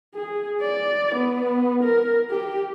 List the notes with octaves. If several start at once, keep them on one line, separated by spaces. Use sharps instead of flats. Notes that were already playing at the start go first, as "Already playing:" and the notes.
G#4
D5
B3
A#4
G4